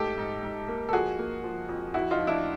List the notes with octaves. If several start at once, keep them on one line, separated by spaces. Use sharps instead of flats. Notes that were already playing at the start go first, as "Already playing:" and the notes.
Already playing: G#2 A3 G4 A4
G#2
G#2
A#3
A4
F3 F#4 G#4
A#3
F3
F2
F2 E4 F#4
D#4 F4
F3
D4 E4